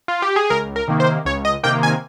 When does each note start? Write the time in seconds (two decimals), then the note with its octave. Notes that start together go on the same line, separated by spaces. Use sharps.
0.08 F4
0.22 G4
0.36 G#4
0.50 C#2 A#4
0.76 A#4
0.88 C3 D#3 A#3
1.00 C5
1.25 C#2 C#5
1.45 D#5
1.63 C3 D#3 A#3 G5
1.83 G#5